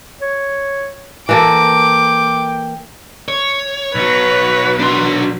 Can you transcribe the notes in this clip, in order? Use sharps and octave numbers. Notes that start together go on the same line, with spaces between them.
C#5
E3 A#3 A4 G5 D6
C#5
B1 F#3 B4
D4 C6